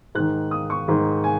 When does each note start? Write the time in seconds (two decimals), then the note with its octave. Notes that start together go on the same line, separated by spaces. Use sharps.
0.15 G#2 D#3 F#6
0.51 D#6
0.70 C#6
0.88 G#2 D#3
1.24 G#5